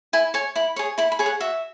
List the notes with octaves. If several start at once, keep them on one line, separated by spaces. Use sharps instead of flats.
E4 G#5
C#5 G#5
E4 B5
G#4 C#5
E4 B5
B5
G#4 C#5
F#5
F#4 E5